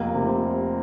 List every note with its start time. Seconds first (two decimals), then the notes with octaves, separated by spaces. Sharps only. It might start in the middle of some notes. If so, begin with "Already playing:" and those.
Already playing: F1 A#3
0.14 C3
0.27 C4